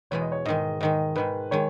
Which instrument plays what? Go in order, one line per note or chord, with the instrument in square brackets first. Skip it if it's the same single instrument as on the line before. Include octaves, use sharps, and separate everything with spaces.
[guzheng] E2 B2 G#3 [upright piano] C#5
[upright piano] D#5
C#5
[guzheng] G#2 D#3 G#3 [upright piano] D#5
[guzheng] G#2 D#3 G#3 [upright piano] D#5
[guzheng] G#2 D#3 G#3 [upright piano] B4
[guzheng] D#3 G#3 [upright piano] C#5